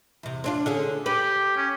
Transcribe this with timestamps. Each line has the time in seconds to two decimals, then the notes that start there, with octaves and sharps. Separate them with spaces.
0.23 E2 C3
0.44 C4 D4 F4
0.66 D3 C#4 G#4
1.06 G4 B4
1.57 C#4